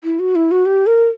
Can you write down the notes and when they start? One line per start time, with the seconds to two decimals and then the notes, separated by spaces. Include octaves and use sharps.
0.04 E4
0.19 F#4
0.35 E4
0.51 F#4
0.66 G4
0.86 A#4